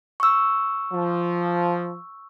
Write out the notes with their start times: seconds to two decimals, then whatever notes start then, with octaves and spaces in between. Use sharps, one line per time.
0.20 C#6 E6
0.93 F3